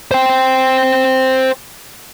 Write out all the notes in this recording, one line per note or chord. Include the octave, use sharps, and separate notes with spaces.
C5 G5